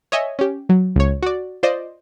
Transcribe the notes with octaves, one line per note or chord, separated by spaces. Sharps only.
C#5 D#5 E5 G#5
C#4 G4
F#3
C#2 C#5
F#4 D5
F4 C5 D5 D#5